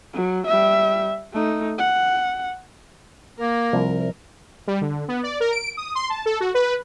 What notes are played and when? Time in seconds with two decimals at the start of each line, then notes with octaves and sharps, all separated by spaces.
0.13 F#3
0.46 G3 E5
1.33 A3 D#4
1.78 F#5
3.39 A#3 A#4
3.73 C2 F3
4.67 G3
4.81 D3
5.08 B3
5.23 D5
5.40 A#4
5.52 D7
5.77 D#6
5.95 C6
6.10 A5
6.26 A4
6.40 F#4
6.54 B4